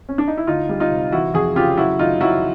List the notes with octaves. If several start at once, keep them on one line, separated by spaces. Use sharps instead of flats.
C#4
D4
D#4
E4
D2 D#4 F4
G3
D#4 F4
C3
E3 E4 F#4
F2 F#4 G#4
C#3 F4 G4
F#3 E4 F#4
F#1 D#4 F4
F#3 E4 F#4